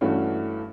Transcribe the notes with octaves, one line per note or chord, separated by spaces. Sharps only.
G2 E3 A3 C#4 F#4